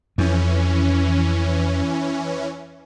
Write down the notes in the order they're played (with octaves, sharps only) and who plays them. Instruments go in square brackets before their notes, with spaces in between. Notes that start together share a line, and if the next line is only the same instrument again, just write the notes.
[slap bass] F2 [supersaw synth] E3 C#4